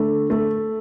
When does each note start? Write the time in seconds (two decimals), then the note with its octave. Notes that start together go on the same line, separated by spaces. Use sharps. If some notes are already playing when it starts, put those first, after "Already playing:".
Already playing: D3 A3
0.30 A3